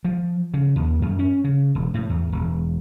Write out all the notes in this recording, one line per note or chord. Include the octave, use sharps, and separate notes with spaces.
F3
C#3
D#2
F#2
C#4
C#3
E1
A2
E2
E1